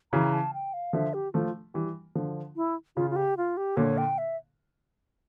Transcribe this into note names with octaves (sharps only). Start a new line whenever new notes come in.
C#3 E3 A#5
A5
G5
F5
D3 F3 E5
G4
F3 A3 F4
E3 G3
D3 F3
E4
C#3 F4
F4
G4
F4
G4
A#2 D3 C#5
G5
E5